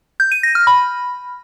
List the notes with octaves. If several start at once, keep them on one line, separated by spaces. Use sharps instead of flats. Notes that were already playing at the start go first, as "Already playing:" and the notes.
G6
D#7
A#6
F6
B5